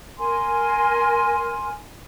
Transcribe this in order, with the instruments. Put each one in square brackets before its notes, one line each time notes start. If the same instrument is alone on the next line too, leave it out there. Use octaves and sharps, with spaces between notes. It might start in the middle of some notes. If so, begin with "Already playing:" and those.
[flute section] A#4 G#5 C6